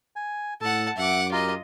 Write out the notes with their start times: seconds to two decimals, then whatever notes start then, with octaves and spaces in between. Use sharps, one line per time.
0.16 G#5
0.61 A2 A4 F#5 A5
0.97 F#2 E5 F#5 D6
1.32 F4 G4 A#4 D#5 A#5